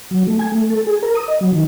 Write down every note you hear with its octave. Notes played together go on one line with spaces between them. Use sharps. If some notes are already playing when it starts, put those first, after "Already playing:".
F#3
A3
G#5
A3
A4
G#4
A#4
D#6
D#5
F#3
D#3